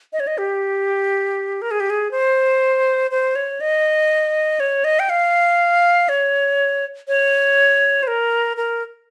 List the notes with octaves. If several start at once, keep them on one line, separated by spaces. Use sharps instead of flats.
D#5
C#5
D#5
G4
A#4
G#4
G4
G#4
C5
C5
C#5
D#5
C#5
D#5
G5
F5
C#5
C#5
C5
A#4
A#4